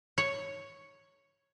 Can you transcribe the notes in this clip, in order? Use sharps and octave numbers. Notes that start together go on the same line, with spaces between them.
C#5